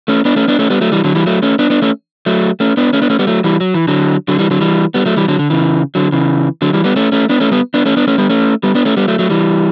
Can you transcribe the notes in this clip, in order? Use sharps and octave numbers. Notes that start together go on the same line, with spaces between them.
A3 C#4
B3 D4
A3 C#4
B3 D4
A3 C#4
G3 B3
F#3 A3
E3 G3
D3 F#3
E3 G3
F#3 A3
A3 C#4
B3 D4
B3 D4
A3 C#4
F#3 A3
A3 C#4
B3 D4
A3 C#4
B3 D4
A3 C#4
G3 B3
F#3 A3
E3 G3
F#3
E3
D3 F#3
D3 F#3
E3 G3
D3 F#3
E3 G3
G3 B3
F#3 A3
E3 G3
D3 F#3
D3
C#3 E3
D3 F#3
C#3 E3
D3 F#3
E3 G3
G3 B3
A3 C#4
A3 C#4
B3 D4
A3 C#4
G3 B3
B3 D4
A3 C#4
B3 D4
A3 C#4
G3 B3
A3 C#4
G3 B3
B3 D4
A3 C#4
G3 B3
F#3 A3
F#3 A3
E3 G3